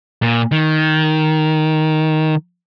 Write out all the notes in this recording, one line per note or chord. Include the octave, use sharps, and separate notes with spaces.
A#2
D#3